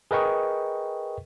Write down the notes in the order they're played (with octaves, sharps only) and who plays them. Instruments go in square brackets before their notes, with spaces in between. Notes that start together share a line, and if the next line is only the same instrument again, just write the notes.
[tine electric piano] G#4 A#4 B4 D#5 G5 C#6